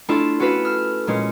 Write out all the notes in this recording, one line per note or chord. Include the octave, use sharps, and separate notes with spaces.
A3 D4 E4 F4 A4
C#4 F#4 A4 B4 F5
E6 F6
A#2 G#3 C#4